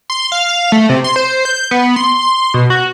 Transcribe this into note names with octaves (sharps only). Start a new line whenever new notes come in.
C6
F5
A3
C3
C6
C5
G6
B3
C6
C6
B2
F#4